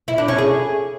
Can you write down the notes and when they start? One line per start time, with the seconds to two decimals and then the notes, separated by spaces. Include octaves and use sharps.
0.08 E4
0.18 D4
0.28 C#4
0.38 G#4